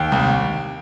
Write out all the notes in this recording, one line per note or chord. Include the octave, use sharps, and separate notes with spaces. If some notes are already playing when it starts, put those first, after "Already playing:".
Already playing: D#2 G5
C2